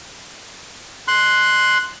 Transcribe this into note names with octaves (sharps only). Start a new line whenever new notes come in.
C6 F#6